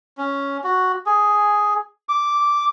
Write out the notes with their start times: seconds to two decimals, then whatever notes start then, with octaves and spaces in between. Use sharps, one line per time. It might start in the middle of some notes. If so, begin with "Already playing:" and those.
0.18 C#4
0.64 F#4
1.06 G#4
2.09 D6